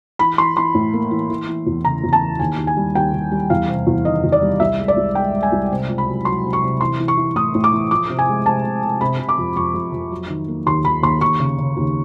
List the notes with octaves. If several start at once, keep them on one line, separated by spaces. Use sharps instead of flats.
E3 B5
E3 C6
E3 C6
A2
A#3
E3
E3
E3
E2
C#3 A#5
E2
A5
E3
D#2 G#5
D#2
G#5
G3
D#2 G5
D#2
G3
E2 F5
C3
E2
D#3 D#5
E2
D5
G3
C2 E5
G#3
D5
C2
G#3 G5
G#3
G#5
C2
C3
C#2
B5
F#3
F#3 C6
C3
C#6
C3
E3 C6
E3
C#6
E3
A2 D#6
A2
D6
E3
F3 D6
C3
G#5
G#3
C3 A5
C3
C3
C3 B5
C3
D6
F2
F2 C#6
F2
F2
F#3
D#3
A#3
D#2 C6
D#2 B5
D#2 C6
D#2 C#6
C#3
C#3
D#2